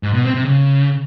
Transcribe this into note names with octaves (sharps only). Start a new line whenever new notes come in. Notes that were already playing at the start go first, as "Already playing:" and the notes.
G#2
B2
C4
C3
C#3